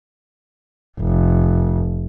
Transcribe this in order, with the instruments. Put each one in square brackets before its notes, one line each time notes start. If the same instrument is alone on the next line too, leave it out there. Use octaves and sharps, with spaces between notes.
[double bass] F1